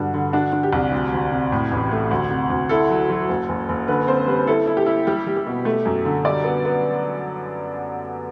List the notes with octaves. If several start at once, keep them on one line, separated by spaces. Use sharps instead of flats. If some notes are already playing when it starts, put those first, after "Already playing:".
Already playing: G2 D3 F#4
D3
D4 F#4
D4
G4
C2
D2
D2
C3
A2
A1
A3
D2
C3
D2
E4 A4
F#3
F#3
F#1
F#1
F#1
D3 B4
C4 C5
G3 B4
E4 A4
E4
G4
E4
G3 G4
G3
G4
B2
A3
F#2
D3
G3 D5
B3
B3